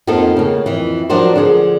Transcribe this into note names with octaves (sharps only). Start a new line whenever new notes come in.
F2 F3 A#3 B3 D#4 A4
C#3 A#3
F2 E3
F3 F#3 D4 F#4 A#4 C5
D3 F3 G#4 C5